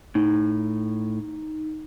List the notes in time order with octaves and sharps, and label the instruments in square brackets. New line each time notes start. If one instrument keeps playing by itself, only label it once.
[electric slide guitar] A2 [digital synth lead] D#4